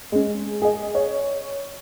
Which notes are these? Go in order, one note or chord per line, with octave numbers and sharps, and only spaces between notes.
G#3 C#4
G#4 D#5
C#5